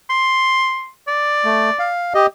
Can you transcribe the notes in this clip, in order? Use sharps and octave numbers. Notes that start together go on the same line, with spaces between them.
C6
D5
A3
F5
G4 D#5